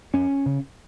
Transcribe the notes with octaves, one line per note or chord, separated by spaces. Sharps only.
F2 C#4
C#3